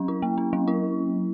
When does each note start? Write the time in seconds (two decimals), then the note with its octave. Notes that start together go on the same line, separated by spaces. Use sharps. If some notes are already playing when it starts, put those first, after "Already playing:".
Already playing: F#3 C#4
0.08 E4
0.22 A#3
0.38 C#4
0.53 F#3
0.68 E4